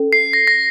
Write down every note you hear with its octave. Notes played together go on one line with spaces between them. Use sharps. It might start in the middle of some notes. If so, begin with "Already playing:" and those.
Already playing: C#4 A4
C7
A#6
A#6